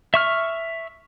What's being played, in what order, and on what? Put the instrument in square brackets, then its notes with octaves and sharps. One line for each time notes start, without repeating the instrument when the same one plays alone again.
[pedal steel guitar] E5 C#6 F6